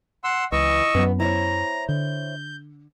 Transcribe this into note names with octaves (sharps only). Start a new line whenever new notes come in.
F#5 C6 E6
C#2 E3 D#5 C#6 E6
F#2 F#3 B3
E4 C5 C#5 A#5
D3 G6